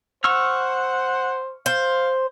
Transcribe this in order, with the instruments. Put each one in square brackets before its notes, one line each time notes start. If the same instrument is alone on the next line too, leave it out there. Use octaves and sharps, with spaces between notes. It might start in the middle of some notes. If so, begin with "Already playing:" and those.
[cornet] C5 [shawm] F#5 [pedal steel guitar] C#6 E6 F6
[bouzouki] C5 [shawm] F5